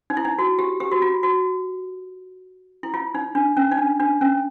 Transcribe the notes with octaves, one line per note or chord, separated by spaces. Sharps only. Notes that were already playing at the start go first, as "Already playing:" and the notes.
D#4
E4
D#4
F#4
G4
G4
F#4
F4
F#4
E4
F4
D#4
D4
C#4
D#4
D4
D4
C#4